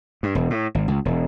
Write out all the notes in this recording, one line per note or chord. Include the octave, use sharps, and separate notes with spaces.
G2
E1
A2
G#1
C#2
E1